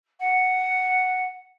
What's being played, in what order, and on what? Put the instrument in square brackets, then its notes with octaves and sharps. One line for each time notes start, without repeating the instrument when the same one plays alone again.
[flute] F#5